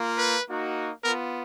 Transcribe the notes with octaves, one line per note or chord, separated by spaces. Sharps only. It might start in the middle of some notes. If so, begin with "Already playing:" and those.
Already playing: A#3 F4
B4
A#3 D#4 F#4
B3 F4 A#4